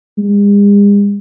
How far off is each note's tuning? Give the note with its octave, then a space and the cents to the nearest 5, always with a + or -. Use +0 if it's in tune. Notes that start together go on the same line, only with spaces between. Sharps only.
G#3 -45